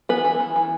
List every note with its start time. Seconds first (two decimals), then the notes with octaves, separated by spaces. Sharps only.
0.09 E3 B3 B4
0.25 E3
0.40 E3
0.56 E3